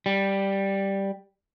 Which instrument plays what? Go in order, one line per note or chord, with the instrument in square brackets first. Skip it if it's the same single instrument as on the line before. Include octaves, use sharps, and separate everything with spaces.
[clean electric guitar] G3